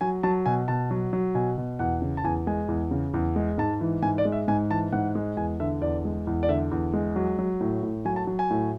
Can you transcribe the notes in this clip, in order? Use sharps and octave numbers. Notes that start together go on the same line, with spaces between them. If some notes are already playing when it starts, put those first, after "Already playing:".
F#3 G#5
F#3 A5
B2 G#5
B2 A5
F#3
F#3
B2 G#5
B2
E2 F#5
C#3
A5
E2 G#5
G#3 G#5
E2
C#3
E2
G#3
G#2 A5
E3
G#2 G#5
D5
G#3
E5
G#2 G#5
E3 A5
G#2 F#5
G#3
E2 G#5
D3 E5
E2 D5
G#3
E2
D5
D3 E5
E2
G#3
F#3
F#3
A2
A2
F#3 G#5
A5
F#3
G#5
A2